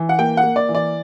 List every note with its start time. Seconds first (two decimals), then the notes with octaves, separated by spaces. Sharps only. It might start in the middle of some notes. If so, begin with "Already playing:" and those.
Already playing: E3
0.09 F#5
0.18 A#3 G5
0.37 F#5
0.43 A#3
0.56 D5
0.69 E3
0.75 D5